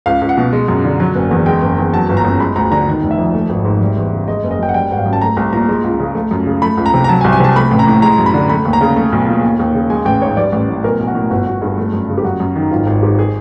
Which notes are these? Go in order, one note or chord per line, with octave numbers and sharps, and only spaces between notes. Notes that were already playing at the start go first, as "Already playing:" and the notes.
C#2 F5
C#2
F#5
B2
G#3
F#2
D3
F#3
F#1
E2
G#3 G5
F#1
E2
F#3 A5
G1
A#5
F#2
G#3 B5
D2 A#5
D3 A#5
D#3
F1
E5
F2
A3
G#1
G#2
G3
E2
C#3
G#3 D#5
F#1
D#5
F#2 G5
F#5
G3 G5
G#1 F#5
F5
F#2
A5
A3 A#5
C2 A#5
A#2 A#5
G#3
C#2
C#3
A3
F#2
C#3
A3 B5
C#2
A#5
C3
A#5
F#3 A5
G#5
C2
G#5
C3 A5
A3 B5
A1
A#5
A2
G#3 A#5
F#2
B5
D3
A3 B5
D#2
A#5
C#3
A3
B1
A#2
D#2
D#2
C#3
G#3 G#5
A1 G5
G#2 C#5
G3 D5
A1
A2
B1 A#4
B1
F#4
A2
G1 F#4
G1 F#4
G2 G#4
A3
F#2
C#3
G4
F#2 F#4
F#2
D#3
G#1 F4
G#1
G#2 G4
G#4